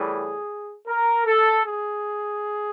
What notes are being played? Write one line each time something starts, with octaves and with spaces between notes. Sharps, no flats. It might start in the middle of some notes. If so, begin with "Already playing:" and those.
Already playing: A2 E3 G3 G#4
A#4
A4
G#4